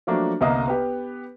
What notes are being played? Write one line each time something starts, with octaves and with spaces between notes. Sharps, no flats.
F3 F#3 A3 A#3 D4 F#4
G1 C2 A#3 D#5 D#6
B3 G4 B4